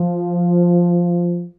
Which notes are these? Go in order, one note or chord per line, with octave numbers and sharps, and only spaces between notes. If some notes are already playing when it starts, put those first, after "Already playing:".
Already playing: F3